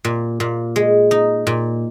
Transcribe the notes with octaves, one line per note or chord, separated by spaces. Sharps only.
A#2
A#2
G#3
D#4
A#2